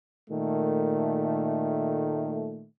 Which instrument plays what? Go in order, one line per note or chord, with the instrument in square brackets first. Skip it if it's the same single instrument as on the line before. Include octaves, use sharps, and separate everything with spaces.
[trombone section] A#2 D#3 A3